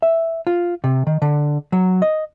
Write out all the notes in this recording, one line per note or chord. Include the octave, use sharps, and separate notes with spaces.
E5
F4
C3
D#3
D3
F#3
D#5